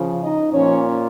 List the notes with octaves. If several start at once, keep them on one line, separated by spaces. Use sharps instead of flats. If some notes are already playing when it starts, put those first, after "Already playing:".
Already playing: C#3 F3
D#4 D#5
A#2 F3 C#4 C#5